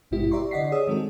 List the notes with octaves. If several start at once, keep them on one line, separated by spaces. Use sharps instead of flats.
G#1 G2 B2 G#3 E4 G4
G4 D5 E5 A#5 C6 C#6
D3 D5 D#5 F#5 B6 C7
G#4 C#5 D#6 E6
D#3 G#3 C4 F#4 A4